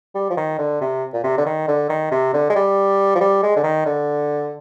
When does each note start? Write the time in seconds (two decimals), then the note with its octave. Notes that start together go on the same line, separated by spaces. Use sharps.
0.15 G3
0.30 F3
0.37 D#3
0.58 D3
0.81 C3
1.13 A#2
1.24 C3
1.38 D3
1.46 D#3
1.68 D3
1.89 D#3
2.11 C3
2.33 D3
2.50 G#3
2.56 G3
3.15 F3
3.21 G3
3.43 G#3
3.56 D3
3.63 D#3
3.86 D3